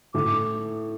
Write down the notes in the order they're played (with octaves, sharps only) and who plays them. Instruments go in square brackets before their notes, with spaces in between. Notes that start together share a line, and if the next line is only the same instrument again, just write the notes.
[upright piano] A2 [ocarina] D6